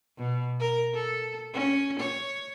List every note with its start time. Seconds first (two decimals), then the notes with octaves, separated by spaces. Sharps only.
0.17 B2
0.60 A#4
0.94 A4
1.53 C#4
1.99 C#5